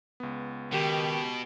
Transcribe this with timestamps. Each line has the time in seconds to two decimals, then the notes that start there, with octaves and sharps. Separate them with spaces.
0.20 C#2 B3
0.72 B2 D#3 G4